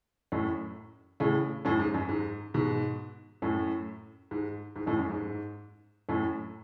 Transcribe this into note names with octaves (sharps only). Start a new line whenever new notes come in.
F#2 A2
A2 C#3
F#2 A2
G#2
F#2
G#2
G#2 B2
F#2 A2
G#2
G#2
F#2 A2
F#2
G#2
F#2 A2